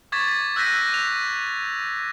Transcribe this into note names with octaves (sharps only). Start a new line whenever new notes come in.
C#6 D6 G#6 A6 B6
E6 F#6 G6 A#6 B6 D#7
F7